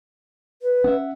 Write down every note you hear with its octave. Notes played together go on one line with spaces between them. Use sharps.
B4
C#4 E5 F#5